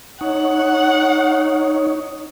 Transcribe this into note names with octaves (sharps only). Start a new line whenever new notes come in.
D#4 C#5 F#5